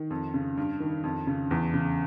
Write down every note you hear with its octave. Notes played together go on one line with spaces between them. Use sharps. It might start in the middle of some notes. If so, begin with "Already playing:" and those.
Already playing: D#3
F2
C#3
G2
D#3
F2
C#3
E2
C#3